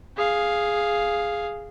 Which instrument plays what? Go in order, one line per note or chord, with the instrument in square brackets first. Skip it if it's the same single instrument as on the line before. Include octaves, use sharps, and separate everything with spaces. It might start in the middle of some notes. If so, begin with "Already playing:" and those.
[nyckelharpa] G#4 F5